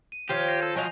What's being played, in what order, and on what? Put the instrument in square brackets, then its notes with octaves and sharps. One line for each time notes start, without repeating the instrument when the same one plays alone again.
[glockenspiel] D#7
[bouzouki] D#3 F3 C4 [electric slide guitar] G4 [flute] C#5
[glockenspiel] G6 A#6 C7
[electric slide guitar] A4
[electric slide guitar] F3 F#3 [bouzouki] A#4 C#5 D#5 [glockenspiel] G#5 F7